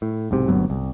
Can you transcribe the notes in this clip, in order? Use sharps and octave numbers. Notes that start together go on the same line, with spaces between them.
A2
B1 G#2 C3
G1 D2 F#3 B3
C2